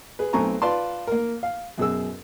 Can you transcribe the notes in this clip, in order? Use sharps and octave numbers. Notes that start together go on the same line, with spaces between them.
G#4 B4
B1 A3 C4 G#5 A#5 C#6
F4 B4 D5 A5 C6
A#3 A#4
F5
F#2 B2 G#4 E6